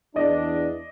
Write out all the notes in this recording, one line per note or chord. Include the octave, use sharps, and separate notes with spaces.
E2 D4 D5 D#5